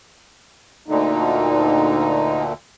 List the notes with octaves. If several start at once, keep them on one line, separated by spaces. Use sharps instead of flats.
D2 A#2 D3 D#4